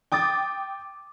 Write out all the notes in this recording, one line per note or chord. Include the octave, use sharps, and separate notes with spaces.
G5 D6 D#6 A6